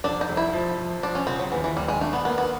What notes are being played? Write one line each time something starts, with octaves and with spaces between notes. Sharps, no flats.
F1 D4
D#4
F1
E4
F3
F3
F3 D4
C#4
C#3 C4
F#3
D#2 E3
E3
D#2 G3
G#3
A3 D4
B3
A#3 B3
B3